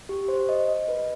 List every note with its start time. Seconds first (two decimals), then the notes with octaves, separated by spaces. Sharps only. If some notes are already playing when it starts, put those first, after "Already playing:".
0.09 G4
0.28 C5
0.49 D#5
0.69 D#5
0.88 B4